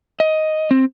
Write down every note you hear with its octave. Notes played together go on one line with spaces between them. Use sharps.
D#5
C4